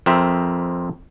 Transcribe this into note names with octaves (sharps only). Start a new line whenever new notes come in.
F2 C4 A#4 C5 E5